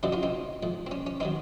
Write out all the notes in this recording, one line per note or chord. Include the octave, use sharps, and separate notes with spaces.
F#2 C#3 F#3 C4 D#4
C#4 F4
C4 D#4
G#2 F3
C4
C#4
C#4
D#3 F#3 C4 D#4